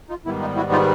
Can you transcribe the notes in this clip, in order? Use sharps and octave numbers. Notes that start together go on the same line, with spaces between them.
D#4 F4
G#2 D#3 G3 B3 E4
D#4 F4
E4 F#4
D#4 F4